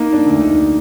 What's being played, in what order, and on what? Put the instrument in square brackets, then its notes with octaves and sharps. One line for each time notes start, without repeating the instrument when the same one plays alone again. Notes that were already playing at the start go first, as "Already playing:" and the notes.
Already playing: [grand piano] A#3 [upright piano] D#4
[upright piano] D4
[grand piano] D2
[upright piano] D#4